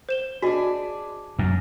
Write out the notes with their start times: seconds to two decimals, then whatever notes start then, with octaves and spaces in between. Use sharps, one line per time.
0.09 C5 E7 G7
0.42 D4 F#4 G#4 D#5
1.39 F#2